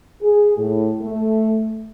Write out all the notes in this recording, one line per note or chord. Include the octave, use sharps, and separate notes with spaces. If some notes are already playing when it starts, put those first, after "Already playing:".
G#4
A2
A3